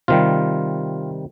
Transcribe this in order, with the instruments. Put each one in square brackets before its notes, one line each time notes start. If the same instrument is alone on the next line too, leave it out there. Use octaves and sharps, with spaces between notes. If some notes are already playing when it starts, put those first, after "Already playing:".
[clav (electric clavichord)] C3 D#3 G3 F4